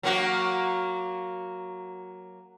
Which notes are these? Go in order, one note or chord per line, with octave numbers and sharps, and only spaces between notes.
F#3 A#3 F#4